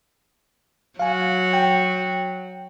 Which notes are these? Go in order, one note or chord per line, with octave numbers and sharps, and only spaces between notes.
F#3 F#4 F5 G#5
G5